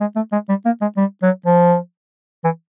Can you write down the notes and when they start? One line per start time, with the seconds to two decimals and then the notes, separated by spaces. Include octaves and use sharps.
0.01 G#3
0.16 A3
0.33 G#3
0.49 G3
0.65 A#3
0.81 G#3
0.97 G3
1.23 F#3
1.46 F3
2.44 E3